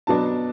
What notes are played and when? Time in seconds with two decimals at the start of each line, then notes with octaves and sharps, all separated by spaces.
0.07 B2 F#3 B3 D4 A5